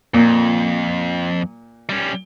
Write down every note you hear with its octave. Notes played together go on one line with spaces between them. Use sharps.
F2 A#2
G3 C#4